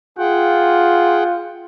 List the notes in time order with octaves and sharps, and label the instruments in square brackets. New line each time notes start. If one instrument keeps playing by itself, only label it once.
[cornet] F4 [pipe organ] G#4 F#5 G5